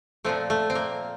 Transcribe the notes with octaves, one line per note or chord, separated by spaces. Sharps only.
A#2 F3 A3 C4
A3
C4
A#3